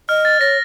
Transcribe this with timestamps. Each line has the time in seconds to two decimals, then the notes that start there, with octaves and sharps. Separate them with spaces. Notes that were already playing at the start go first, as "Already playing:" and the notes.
0.09 D#5 F6
0.25 A6
0.41 C#5 A#6